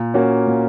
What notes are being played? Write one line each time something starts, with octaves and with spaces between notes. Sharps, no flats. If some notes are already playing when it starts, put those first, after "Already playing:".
Already playing: A#2
A#3 C#4 F#4
A#2